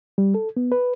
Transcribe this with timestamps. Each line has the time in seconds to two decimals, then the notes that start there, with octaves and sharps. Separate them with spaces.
0.18 G3
0.35 A4
0.57 B3
0.72 B4